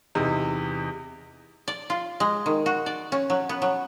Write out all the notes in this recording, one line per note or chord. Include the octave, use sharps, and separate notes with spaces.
E2 C3 D#4
D5
F4
G#3
D#3
F#4
D5
C#4
F#3
B3
F#3